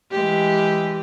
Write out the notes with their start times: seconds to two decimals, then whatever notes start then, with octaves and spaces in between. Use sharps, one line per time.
0.12 E3 G#3 G4